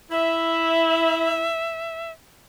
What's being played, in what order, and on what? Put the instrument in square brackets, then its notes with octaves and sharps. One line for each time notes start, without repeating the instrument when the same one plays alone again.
[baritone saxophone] E4 [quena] E5